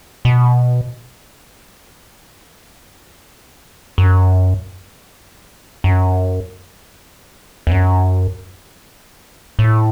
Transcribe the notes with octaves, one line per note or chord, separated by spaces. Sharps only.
B2
F#2
F#2
E2
F#2
A2